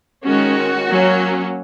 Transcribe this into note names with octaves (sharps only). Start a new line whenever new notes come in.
D#3 G#3 C#4 F#4
F#3 A#3 C#4